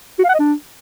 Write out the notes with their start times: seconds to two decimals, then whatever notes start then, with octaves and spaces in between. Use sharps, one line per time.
0.19 F#4
0.24 F5
0.29 F#5
0.34 D#5
0.39 D4